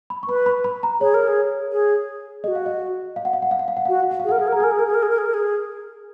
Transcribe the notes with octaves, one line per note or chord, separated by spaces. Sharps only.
B5
C#6
B4 B5
B5
B5
A#5
G#4 C#5
A#4
G#4
G#4
F#4 G#4 D#5
F5
D#5
F5
F#5
F5
F#5
F5
F#5
F5
F#5
F#4 F5
F#5
F5
F#5
F5
G#4
A#4 F#5
G#4 F5
A#4
G#4 A#5
A#4 G#5
G#4
A#4
G#4
A#4
G#4
A#4
G#4
A#4
G#4